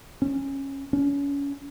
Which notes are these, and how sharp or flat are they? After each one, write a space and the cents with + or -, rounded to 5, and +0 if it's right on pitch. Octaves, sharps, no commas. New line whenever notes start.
C#4 -15
C#4 +30